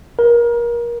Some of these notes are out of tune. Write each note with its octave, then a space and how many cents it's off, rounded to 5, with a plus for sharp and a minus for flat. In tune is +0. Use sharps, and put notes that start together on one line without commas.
A#4 +25